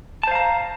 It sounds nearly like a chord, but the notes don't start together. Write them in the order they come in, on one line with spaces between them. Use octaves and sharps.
A5 C5 F5 A#5